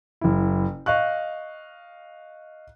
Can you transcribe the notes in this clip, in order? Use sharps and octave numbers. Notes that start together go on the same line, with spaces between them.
F#1 E4
D#5 F5 C#6 F#6